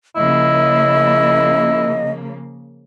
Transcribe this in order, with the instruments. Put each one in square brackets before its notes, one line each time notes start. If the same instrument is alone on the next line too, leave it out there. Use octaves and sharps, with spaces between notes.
[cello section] C#3 F3 A#3 [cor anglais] E4 [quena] D#5